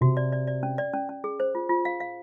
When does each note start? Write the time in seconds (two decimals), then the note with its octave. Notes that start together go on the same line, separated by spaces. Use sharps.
0.01 C3 F#4
0.17 D5
0.32 D5
0.47 D5
0.63 C#4
0.78 D5
0.93 C#4
1.09 C#4
1.24 G#4
1.40 C5
1.55 F4
1.69 F4
1.85 F5
2.00 F5